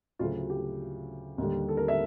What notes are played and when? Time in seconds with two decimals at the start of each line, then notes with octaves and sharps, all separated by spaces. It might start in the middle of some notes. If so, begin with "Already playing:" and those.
0.19 D2 C#3 F#3 A3 F4
0.50 G4
1.38 D#2 D3 G3
1.69 A4
1.77 A#4
1.88 E5